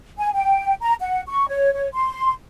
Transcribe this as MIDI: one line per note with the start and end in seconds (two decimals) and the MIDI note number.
0.19 0.29 80
0.34 0.74 79
0.82 0.94 82
1.00 1.21 78
1.28 1.48 85
1.49 1.71 73
1.74 1.89 73
1.94 2.32 84